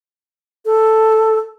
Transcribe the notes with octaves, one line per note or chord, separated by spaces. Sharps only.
A4